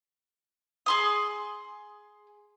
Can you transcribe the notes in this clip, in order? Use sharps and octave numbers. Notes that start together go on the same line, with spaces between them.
G#4 C6 D#6